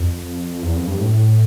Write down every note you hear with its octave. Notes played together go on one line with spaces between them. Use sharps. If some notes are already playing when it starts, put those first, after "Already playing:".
Already playing: F2
E2
F2
G2
A2